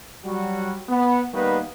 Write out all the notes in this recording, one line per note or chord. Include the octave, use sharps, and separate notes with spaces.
F#3 G3 F#4
B3
D#3 G3 A#3 B3 D#4 B4